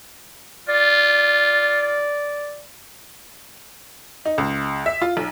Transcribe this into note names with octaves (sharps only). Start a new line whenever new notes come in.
F4 D5
D#4
C#2
E5
F4
B1